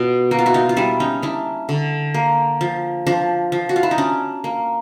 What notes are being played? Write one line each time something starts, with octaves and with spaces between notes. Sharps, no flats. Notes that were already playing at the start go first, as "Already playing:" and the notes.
Already playing: B2 F4
A#3 F#4
F4
E4 F#4
D#4 F4
F4
G3 D4 E4
C#4 D#4
C#4 D4 E4
D3
A#3
F3
F3 D4
F3
F#4
F4
E4
D#4
C#4 D4
A#3